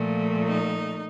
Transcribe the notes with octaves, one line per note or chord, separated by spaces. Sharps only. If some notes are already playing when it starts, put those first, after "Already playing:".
Already playing: A#2 F3 A3
D#4